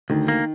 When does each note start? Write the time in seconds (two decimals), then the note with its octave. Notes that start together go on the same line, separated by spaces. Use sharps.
0.10 D2 D#3
0.28 A#3